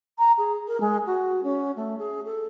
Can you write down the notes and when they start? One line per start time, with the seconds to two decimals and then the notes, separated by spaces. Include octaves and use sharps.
0.18 A#5
0.38 G#4
0.68 A#4
0.80 G#3
1.06 F#4
1.43 C#4
1.76 A3
1.98 G#4
2.25 A4